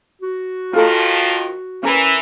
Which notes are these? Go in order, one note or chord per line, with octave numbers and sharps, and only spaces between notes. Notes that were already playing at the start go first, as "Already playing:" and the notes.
F#4
A#2 D#3 F3 F4 A4 A#5
E3 C#4 A#4 B4